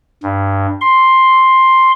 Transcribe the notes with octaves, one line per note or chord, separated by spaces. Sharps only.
G2
C6